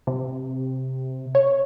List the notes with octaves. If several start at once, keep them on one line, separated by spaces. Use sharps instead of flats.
C3
C#5